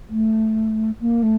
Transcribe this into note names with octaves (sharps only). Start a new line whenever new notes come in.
A3
A#3
A3